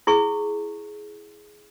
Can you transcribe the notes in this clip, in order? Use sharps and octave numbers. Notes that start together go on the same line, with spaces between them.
E4 G#4 C#6